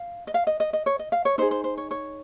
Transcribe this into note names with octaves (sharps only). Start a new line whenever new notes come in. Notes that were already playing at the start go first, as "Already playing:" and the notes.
Already playing: F5
D#5
F5
D#5
D#5
D#5
C#5
D#5
F5
C#5
D#4 G#4 C5
C5
C5
C#5
C#5